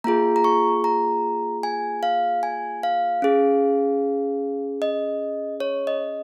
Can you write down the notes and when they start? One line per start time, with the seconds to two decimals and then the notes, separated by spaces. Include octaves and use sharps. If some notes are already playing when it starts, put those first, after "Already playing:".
0.04 A#3 F4 G#4 A#5
0.36 A#5
0.44 C#6
0.84 A#5
1.63 G#5
2.03 F5
2.43 G#5
2.83 F5
3.22 C#4 G#4
4.82 D#5
5.60 C#5
5.87 D#5